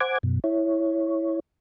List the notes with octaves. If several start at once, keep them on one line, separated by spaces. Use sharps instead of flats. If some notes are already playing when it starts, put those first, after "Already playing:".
C5 F#5 G#5 D6 G#6
F#2 B2
E4 C#5